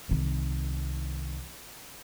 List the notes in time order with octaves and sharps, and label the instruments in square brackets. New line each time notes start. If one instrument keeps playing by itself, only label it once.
[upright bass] C2 D#3